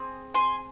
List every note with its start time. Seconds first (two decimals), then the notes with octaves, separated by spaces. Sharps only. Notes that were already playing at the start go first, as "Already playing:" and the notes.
Already playing: C4 G#4
0.34 G#5 C6